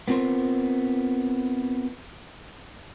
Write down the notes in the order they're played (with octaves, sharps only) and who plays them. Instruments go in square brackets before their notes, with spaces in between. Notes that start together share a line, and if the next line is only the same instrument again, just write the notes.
[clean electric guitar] B3 C4 F4 A#4 C5